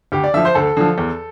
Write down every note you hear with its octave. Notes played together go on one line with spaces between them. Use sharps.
D2 G4
D5
D3 F3 E5
C5
D2 A4
D3 F3
E2